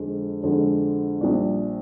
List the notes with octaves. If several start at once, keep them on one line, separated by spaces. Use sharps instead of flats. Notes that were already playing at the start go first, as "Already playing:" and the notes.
Already playing: F2 D3 G#3
F2 D3 G#3
A#1 A#2 G3 D4